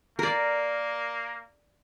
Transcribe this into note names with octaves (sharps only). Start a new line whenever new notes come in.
A#3 A#4 D5